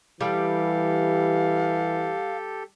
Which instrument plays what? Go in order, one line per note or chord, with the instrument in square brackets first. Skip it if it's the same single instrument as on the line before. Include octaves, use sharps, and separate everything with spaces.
[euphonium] E3 [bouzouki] G3 [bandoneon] G4 A4 [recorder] F5